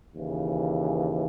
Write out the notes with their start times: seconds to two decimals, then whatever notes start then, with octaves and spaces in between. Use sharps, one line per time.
0.14 D#2 C#3 E3